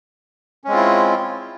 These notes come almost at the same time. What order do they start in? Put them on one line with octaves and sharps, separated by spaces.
C#4 G#3 C4 F4 E4